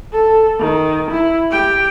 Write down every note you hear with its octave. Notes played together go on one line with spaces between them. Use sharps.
A4
D#3
E4
G4 G5